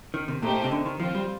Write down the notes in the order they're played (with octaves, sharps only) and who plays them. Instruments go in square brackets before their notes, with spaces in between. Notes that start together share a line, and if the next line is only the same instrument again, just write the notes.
[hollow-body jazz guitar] D#3
C3
[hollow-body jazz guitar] A#2 [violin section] A3 D#4 G4 C5
[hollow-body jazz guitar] C3
D3
D#3
[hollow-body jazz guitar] F3 [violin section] C4 F4 C5
[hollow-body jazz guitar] G3